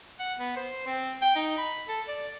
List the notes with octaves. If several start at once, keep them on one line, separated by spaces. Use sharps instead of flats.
F#5
B3
C5
C4
G5
D#4
B5
A4
D5